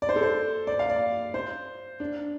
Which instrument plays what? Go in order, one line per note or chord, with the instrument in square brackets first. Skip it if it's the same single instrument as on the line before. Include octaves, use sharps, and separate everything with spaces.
[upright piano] D5
C5
A4
C5
D5
F5
D5
C5
D4